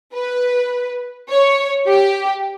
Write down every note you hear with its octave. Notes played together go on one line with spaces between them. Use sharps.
B4
C#5
G4